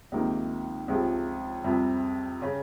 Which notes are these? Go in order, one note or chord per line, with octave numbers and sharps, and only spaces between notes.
C#2 C3 D#3 A#3 D#4
C#2 C3 F3 G#3
F2 C3 G3
C#3